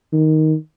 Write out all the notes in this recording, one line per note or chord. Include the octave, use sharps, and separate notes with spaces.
D#3